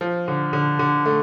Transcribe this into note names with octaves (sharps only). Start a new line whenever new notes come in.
F3
D3
D3
D3
A3